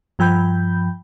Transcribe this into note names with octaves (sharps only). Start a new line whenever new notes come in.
G2 F3 G5 B5 G6